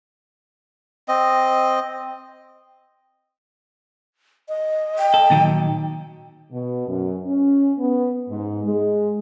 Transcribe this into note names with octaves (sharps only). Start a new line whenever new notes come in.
C4 D#5
D#5
G5
A4
A#2 D#3 F#3
B2
F#2
C#4
B3
G#2
G#3